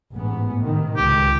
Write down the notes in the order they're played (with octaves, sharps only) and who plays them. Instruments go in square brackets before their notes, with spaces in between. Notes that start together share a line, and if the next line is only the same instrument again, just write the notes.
[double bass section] A1 G#2 B3
C3 D#3
[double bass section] C#2 [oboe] G4